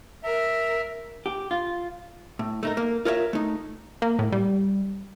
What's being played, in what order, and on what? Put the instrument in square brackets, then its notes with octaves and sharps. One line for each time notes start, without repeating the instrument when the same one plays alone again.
[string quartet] A#4 [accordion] E5
[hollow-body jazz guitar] G4
F4
A2
A3 D#4 A#4
A#3
F4 A#4 C#5 D5 E5
A3 D#4
[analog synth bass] A#3
A2
G3